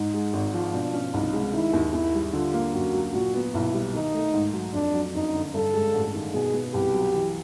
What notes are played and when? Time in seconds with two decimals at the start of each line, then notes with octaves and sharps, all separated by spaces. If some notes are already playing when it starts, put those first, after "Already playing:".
Already playing: G#2 D#4
0.14 G#3
0.33 G#1
0.54 F3
0.73 B2 D4
0.94 C#4
1.14 C2 D#4
1.33 G#3
1.54 D#3 E4
1.73 D#2
1.93 D#2 E4
2.14 G3
2.33 D3 F4
2.54 A#3
2.73 F#2 F#4
2.94 F#3
3.13 A#2 F#4
3.34 B3
3.54 B1 E4
3.74 G3
3.94 D#3 D#4
4.14 A3
4.33 G#2
4.53 F#3
4.73 F2 D4
4.94 F#3
5.14 F#1 D#4
5.34 D3
5.54 G2 A4
5.74 G#3
5.94 A1
6.14 D#3
6.33 B2 G#4
6.54 B3
6.74 C2 G4
6.94 F#3
7.14 E3